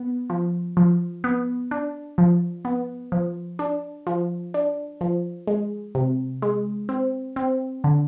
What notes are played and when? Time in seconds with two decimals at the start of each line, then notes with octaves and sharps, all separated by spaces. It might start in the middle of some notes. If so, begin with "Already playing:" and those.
Already playing: B3
0.30 F3
0.77 F3
1.24 B3
1.71 D4
2.18 F3
2.65 B3
3.12 F3
3.59 D4
4.07 F3
4.54 D4
5.01 F3
5.47 G#3
5.95 C3
6.42 G#3
6.89 C4
7.36 C4
7.84 D3